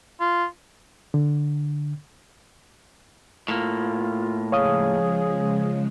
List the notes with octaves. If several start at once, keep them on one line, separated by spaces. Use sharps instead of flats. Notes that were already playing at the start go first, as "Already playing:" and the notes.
F4
D3
A2 A#3 F4
C#3 F3 G#3 G#4 C#5 F5 D#6